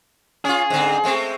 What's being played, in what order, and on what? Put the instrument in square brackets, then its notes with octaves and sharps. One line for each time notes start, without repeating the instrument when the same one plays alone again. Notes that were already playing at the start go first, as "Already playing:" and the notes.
[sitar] C#4 F4 [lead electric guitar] G#4
[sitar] G#2 D3 C4
G#3 A3 C4